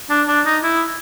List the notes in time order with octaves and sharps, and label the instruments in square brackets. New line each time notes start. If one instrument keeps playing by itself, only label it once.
[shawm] D4
D4
D#4
E4